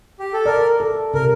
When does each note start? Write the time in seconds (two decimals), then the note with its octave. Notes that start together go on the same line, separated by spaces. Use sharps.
0.19 G4
0.33 A4
0.46 A#4 D5
0.80 A4
1.14 C3 A#4